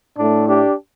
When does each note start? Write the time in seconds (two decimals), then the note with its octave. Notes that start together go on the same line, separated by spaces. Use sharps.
0.17 A2 A3 D4
0.48 D4 G4